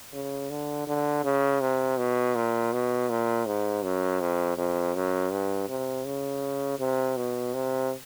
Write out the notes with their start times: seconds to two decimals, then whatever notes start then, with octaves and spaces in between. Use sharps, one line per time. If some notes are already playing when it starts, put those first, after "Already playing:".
0.13 C#3
0.50 D3
0.87 D3
1.24 C#3
1.61 C3
1.98 B2
2.35 A#2
2.73 B2
3.09 A#2
3.46 G#2
3.83 F#2
4.20 F2
4.57 F2
4.95 F#2
5.32 G2
5.69 C3
6.06 C#3
6.79 C3
7.17 B2
7.54 C3